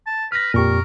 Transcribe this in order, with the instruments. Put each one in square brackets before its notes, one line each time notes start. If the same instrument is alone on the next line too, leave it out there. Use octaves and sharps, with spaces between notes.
[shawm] A5
[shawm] B4 [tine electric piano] F6 A#6
[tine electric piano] F2 C#6 [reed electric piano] A#2 G4 [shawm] A#4